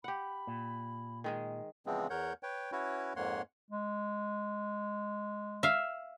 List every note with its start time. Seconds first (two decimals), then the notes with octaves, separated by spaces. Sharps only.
0.04 G4 F#5 B5
0.47 A#2
1.24 D#3 G#3 G#4
1.86 C#3 E3 F3 G#3 B3 C4
2.10 E2 A#4 C#5 F#5 G6
2.43 B4 C#5 G5
2.72 C#4 E4 F#4 B4 C#5
3.16 F2 G#2 A#3 C#5 F#5 C6
3.70 G#3
5.63 E5 F5